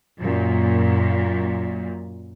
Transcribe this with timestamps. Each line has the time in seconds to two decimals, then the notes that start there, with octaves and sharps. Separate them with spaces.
0.19 F#2 A#2